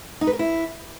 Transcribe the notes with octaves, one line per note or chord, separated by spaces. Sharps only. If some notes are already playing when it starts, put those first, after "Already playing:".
D#4
B4
A#4
E4